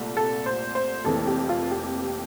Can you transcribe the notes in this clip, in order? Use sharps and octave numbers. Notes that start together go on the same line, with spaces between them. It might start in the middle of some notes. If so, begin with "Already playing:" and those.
Already playing: C2 A#2 A3
A4
C5
C5
F1 F2 E3 A#3 A4
G4
F4
G4